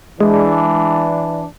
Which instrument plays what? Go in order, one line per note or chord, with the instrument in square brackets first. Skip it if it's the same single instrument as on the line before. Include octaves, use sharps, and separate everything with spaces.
[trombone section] E3 D4 [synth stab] G#3